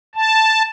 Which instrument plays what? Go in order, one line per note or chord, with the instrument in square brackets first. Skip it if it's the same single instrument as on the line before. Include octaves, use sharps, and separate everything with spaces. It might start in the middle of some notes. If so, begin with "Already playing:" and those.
[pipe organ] A5